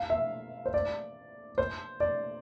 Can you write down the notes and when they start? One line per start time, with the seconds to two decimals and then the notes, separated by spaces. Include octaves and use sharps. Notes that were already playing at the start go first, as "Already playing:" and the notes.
Already playing: F5
0.10 E5
0.66 C5
0.74 D5
1.58 C5
2.00 D5